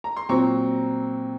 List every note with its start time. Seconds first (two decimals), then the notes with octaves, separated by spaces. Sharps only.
0.04 A#5
0.16 C6
0.29 A#2 F#3 C4 A#5 C#6